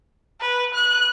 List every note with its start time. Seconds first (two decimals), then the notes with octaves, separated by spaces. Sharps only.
0.41 B4
0.74 F#6